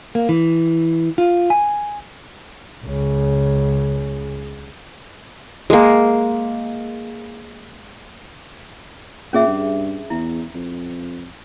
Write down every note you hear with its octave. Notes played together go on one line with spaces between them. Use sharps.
A#3
E3
F4
G#5
C#2 C#3
G#3 A#3
A#2 C#4 G#4 E5
G2
E2 E4
F2